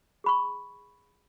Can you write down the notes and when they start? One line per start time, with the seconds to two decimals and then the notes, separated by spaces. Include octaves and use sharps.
0.24 G#4 B5 C#6